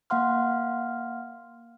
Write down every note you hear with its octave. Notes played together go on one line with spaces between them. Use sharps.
A#3 F5 F#5 C6 F6